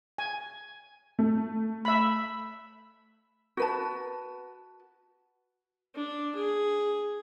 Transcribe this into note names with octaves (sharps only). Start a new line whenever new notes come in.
G#5
A3
E5 B5
F#4 B4 A5
D4
G#4